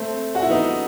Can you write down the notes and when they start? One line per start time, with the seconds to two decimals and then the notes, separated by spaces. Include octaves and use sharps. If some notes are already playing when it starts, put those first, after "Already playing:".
Already playing: A3 C4
0.35 F#4
0.42 E4
0.50 B3 D#4